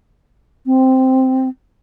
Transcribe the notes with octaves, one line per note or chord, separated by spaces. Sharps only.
C4